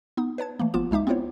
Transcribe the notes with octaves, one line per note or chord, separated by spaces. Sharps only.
B3 D#4 D#6
B4 C#5 A5 G#6
E3 A3 A#3
G1 F3 B3 F4 D6 E7
C#2 G#3 D#4 E5 D6
B3 C4 E4 F4 C5 C#5